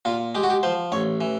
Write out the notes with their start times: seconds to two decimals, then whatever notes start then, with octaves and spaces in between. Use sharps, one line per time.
0.05 A#2 F4
0.35 G#3 G4
0.43 F#4
0.50 G4
0.63 F3 C5
0.92 A1 C#5
1.21 E3